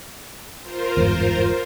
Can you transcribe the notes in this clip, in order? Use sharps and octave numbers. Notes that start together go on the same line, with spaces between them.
F4 A#4 C5
G1 E2 G#2